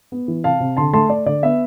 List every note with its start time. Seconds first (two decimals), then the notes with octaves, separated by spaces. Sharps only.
0.12 B3
0.28 E3
0.44 C3 F5 A5
0.60 C3
0.77 D3 A5 C6
0.93 A3 A5 C6
1.10 A3 D5
1.26 D3 D5
1.43 B3 E5